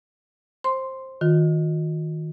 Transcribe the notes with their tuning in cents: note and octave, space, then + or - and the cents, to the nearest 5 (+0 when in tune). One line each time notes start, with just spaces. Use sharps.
C5 +15 C6 +0
D#3 +15 F4 +45